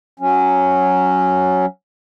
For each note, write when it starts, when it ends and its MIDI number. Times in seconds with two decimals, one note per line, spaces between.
0.20 1.66 54
0.20 1.66 61